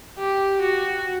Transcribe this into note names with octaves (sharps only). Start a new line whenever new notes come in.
G4
F#4